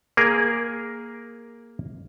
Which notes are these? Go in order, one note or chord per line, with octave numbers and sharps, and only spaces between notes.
A#3 G#4 A#4